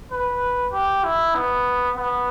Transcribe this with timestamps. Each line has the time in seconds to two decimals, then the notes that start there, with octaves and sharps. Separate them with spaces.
0.12 B4
0.73 G4
1.04 E4
1.35 B3
1.97 B3